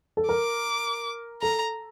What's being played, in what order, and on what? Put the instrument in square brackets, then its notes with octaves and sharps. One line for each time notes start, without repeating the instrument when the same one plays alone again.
[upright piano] A4
[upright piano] A#4 [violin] D6
[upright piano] A4 [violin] A#5